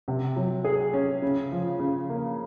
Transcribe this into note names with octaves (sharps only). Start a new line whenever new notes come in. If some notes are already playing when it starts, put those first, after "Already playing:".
C3
F#3
G#4
C#4
C#3
F3
C#3
A#3